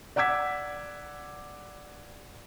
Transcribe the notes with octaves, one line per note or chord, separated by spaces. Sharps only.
D5 F#5 D6 E6 G#6 B6